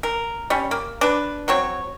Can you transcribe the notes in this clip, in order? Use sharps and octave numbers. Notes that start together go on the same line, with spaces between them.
A#4
G3 C#4
A#3
D4 B4
F#3 C4 C#5